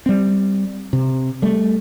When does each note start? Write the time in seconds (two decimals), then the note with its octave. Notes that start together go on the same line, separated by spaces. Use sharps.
0.06 G3 C4
0.93 C3
1.42 G3 A3